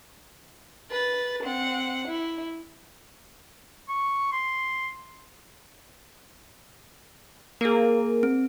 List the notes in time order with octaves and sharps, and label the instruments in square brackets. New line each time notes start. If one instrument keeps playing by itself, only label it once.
[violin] B4 A6
C4 F#5
E4
[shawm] C#6
C6
[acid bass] A#3 [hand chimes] G#4 A#4
[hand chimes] C4